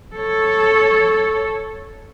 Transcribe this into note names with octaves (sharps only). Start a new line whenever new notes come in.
A4 C#5